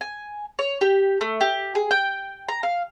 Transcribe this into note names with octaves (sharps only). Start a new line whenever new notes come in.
G#5
C#5
G4
A3
G4
G#4
G5
A#5
F5